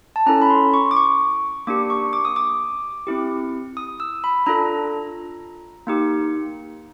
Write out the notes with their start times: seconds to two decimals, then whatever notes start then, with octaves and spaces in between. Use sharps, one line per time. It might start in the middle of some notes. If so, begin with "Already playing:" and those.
0.16 A5
0.27 C#4 E4 A4 A#5
0.42 B5
0.50 C6
0.74 C#6
0.91 D6
0.97 C#6
1.67 A#3 D4 G4 D6
1.90 C#6
2.13 D6
2.25 D#6
2.36 D6
3.07 C4 E4 G4
3.77 D#6
4.00 E6
4.24 B5
4.46 D4 F4 A4 A#5
5.87 A#3 D#4 G4